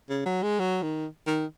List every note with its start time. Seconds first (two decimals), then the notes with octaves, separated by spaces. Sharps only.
0.09 C#3
0.25 F#3
0.43 G#3
0.59 F#3
0.82 D#3
1.27 D#3